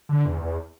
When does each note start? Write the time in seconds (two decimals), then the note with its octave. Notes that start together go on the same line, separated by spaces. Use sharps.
0.09 D3
0.26 E2
0.41 E2